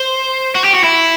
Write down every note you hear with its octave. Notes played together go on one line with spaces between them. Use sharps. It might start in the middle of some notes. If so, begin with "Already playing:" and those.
Already playing: C5
F#4
G4
F#4
E4